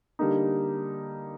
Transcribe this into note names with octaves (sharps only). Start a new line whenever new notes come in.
D3 G3 A#3 D#4